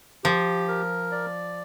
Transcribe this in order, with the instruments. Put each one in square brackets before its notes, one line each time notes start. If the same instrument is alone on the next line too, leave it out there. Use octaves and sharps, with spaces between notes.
[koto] F3 [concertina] G4
[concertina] A#4
D5